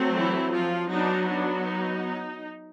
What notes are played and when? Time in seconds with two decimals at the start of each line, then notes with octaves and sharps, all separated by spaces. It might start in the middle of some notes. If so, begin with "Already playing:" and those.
Already playing: F#3 A3 C4
0.15 E3 E4
0.52 F3 F4
0.90 F#3 B3 D4 D#4
1.28 D4
1.65 D#4